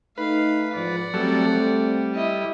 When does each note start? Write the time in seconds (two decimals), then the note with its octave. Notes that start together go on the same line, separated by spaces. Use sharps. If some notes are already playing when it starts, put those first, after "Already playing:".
0.18 A3 D#4 B4 F5
0.75 G#2 E3 F3 D5 F#5
1.14 F#3 G3 A3 C4 A4
1.55 G3
2.14 E4 D#5